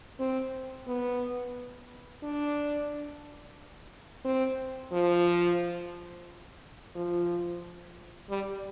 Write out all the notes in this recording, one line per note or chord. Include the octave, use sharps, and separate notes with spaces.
C4
B3
D4
C4
F3
F3
G3